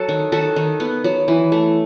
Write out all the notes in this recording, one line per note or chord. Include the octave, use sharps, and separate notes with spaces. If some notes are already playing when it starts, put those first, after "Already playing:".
Already playing: F#3 F#4 A4
D#3
D#3 F#4 A4
D#3
B3
F#3
E3
A3